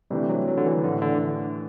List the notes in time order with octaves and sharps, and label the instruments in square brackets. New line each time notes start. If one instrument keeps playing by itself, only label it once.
[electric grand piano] C3 E3 A3 D4 G4 [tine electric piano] G3
[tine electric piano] F#3
F#3
D3
E3
[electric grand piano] A2 E3 A3 [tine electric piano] D3
[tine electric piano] D3